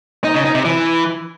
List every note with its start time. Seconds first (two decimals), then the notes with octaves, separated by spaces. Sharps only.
0.24 D#4
0.34 C#3
0.44 D#4
0.55 C3
0.65 E3